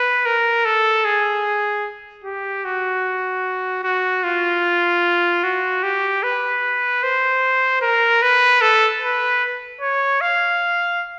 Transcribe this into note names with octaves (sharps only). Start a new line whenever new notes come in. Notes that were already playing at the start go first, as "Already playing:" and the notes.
Already playing: B4
A#4
A4
G#4
G4
F#4
F#4
F4
F#4
G4
B4
C5
A#4
B4
A4
B4
C#5
F5